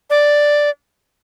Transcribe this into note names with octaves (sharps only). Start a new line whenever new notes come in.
D5